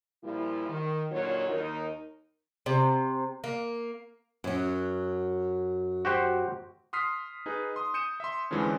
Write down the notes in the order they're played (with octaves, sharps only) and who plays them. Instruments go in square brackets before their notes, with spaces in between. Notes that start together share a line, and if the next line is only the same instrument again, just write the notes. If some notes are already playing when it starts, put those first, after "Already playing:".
[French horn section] A#2 F3 G3 E4
D#3
A#2 D3 F#3 D#4 F4 C#5
D#2 D#4 A#4
[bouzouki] C3
A#3
[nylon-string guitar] F#2 F#3
[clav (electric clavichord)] F#4 G4 C5
[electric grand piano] C6 D#6 F6 B6 C7
D#4 G#4 B4
C6 D#6
D#6 G6 C#7 D#7 E7
E5 C6
F2 D3 E3 F3 G#3 C#4